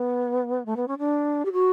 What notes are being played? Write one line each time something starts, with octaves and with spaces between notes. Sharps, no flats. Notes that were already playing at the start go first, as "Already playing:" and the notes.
Already playing: B3
A3
B3
C#4
D4
G4
F#4